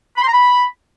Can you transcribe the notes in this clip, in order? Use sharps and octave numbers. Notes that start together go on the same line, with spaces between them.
B5
C6
A#5
B5